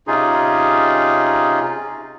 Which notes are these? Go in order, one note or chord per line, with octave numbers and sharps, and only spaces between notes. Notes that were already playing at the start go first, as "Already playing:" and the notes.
C3 C#4 D#4 F4 G#4